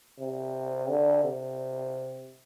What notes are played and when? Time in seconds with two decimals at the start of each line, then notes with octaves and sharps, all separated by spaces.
0.20 C3
0.89 D3
1.24 C3